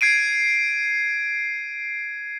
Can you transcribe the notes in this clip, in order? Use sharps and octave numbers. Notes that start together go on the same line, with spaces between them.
G#6 C7 D7 D#7